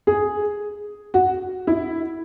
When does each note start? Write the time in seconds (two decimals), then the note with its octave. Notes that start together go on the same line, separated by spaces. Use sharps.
0.07 G#4
1.14 F#4
1.67 E4